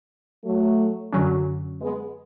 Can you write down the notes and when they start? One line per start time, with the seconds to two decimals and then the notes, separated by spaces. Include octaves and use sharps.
0.44 F#3 A3
1.13 F#2 D3 F#3 C#4
1.81 G#3 B3